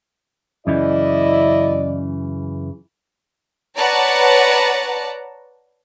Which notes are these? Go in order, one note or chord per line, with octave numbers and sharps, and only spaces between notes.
F#2 C#3 E3 E4 D5 D#5
B4 C#5 D5 F#5 A5 A#5